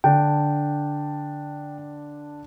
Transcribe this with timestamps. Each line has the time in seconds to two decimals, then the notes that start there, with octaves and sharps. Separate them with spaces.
0.04 D3 D4 G5